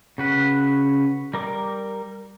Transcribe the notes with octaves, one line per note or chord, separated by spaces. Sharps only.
C#3 F#4 B4
G3 A#4 D6